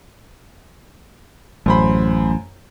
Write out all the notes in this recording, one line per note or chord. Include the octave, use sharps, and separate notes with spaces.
A1 F#2 C5 B5